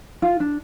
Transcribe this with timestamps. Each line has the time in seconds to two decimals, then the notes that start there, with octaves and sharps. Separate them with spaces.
0.22 F4
0.40 D4